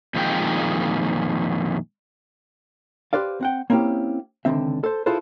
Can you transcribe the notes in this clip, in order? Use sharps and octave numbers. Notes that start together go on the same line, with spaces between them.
F2 A#2 D#3 G#3 G5
G4 B4 C5 D5 F5
C4 F#5 G5
A#3 C4 C#4 E4 G4
C#2 G2 D3 D#3 C4 E5
A4 C5
E4 F4 G#4 A4 B4 C5